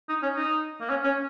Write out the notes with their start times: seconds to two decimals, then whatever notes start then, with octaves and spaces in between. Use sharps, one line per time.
0.09 D#4
0.23 C#4
0.36 D#4
0.81 A#3
0.90 C#4
1.04 C#4